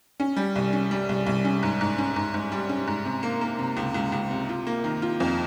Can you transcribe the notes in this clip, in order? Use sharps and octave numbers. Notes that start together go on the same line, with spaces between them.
C#4
G3
C2
C#4
G3
C2
C2
C#4
G#2
G#2
C#4
G#2
G#2
G3
C#4
G#2
C3
A#3
A#3
C3
C#2
C#2
C#2
C3
F4
A#3
D#3
F4
F2